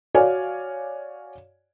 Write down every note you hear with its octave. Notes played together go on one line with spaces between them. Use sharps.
F#4 C#5 D5 F5 G#5